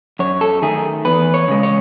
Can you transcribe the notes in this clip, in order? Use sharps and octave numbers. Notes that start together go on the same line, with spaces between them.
F#2 C#5
A4
D#3 A3 G#4
E2 B4
C#5
C#3 G#3
C#5